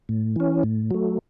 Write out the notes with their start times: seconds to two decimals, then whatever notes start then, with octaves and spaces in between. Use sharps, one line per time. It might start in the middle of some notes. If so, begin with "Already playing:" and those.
0.09 A2
0.36 E3 C#4
0.63 A2
0.91 F#3 A3